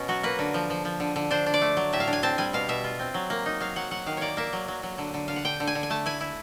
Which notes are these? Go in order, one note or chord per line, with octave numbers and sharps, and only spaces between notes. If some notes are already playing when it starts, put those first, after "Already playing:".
Already playing: B2 C#4
F#3 F#4
A#3 B4
D3
F3
F3
F3
D3
D3
D4 C5
D4
D5
A3
F#3
A2 E5
F5
D4
G#5
C4 A5
G3 G#5
B2 F5
B2 E5
F4
C4
F#3
A#3
D#4
F#3 F5
F#3 F#5
F#3 F#5
D#3 F5
A#3 C#5 D5
A#3 E5
F#3
F#3
F#3
D3
D3
D3 F5
F#5
D3 G5
D3
G#5
D3
G#5
A3 A5
E4 G#5
E4